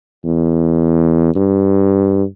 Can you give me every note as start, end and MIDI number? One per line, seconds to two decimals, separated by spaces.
0.25 1.35 40
1.35 2.23 43